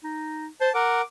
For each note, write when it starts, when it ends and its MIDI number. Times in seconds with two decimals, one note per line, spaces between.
0.04 0.47 63
0.61 0.70 72
0.61 0.72 81
0.75 1.01 70
0.75 1.01 78
0.75 1.03 86